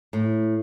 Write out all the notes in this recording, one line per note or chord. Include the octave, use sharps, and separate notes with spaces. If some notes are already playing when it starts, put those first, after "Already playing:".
A2